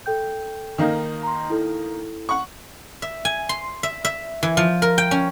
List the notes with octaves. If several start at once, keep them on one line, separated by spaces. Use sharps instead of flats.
A4 G5 G6
D#3 A#3 D#4
A#5 C6
E4 A4
F#5 C#6
E5
G#5
C6
E5
E5
E3
F3
A#4
G5
C#4